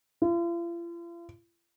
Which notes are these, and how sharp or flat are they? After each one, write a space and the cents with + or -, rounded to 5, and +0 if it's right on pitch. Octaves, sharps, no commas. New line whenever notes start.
F4 -45